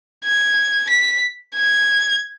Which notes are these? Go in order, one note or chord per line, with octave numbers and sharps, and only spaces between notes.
G#6
B6
G#6